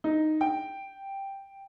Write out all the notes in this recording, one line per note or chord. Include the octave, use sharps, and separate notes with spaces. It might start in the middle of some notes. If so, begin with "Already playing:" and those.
D#4
G5